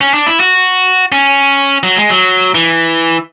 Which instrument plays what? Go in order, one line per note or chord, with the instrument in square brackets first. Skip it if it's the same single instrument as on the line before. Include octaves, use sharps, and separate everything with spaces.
[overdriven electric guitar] C#4
D4
E4
F#4
C#4
F#3
G#3
F#3
E3